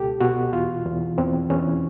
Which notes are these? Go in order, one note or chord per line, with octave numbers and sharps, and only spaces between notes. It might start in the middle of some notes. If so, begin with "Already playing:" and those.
Already playing: C#2 B2 G4 A4
B2 F#4
E2 F4
E2
E2 C4
E2 C#4